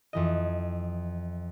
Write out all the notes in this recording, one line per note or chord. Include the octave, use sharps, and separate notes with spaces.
F2 E3 D#5